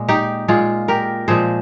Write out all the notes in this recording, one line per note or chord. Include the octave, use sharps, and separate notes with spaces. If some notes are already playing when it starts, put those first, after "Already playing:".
Already playing: A#2 G#3
D#4 G4
A#2 G#3 F4 G#4
G4 A#4
A#2 F3 G#3 G#4 C5